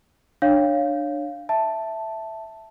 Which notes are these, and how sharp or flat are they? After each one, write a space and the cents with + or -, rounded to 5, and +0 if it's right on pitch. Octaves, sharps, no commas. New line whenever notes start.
D4 +20 C#5 +0 F5 +0
E5 +0 A5 +0